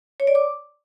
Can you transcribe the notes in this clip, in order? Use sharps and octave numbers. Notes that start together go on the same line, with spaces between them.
C#5
D5
D6